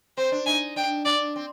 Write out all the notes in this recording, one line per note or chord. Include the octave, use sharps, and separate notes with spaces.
C4 C5
D4
D#4 G#5
D4 G5
D4 D5
C4